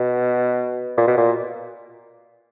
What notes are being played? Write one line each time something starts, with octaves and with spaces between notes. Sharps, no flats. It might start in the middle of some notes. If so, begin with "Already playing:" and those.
Already playing: B2
A#2
B2
A#2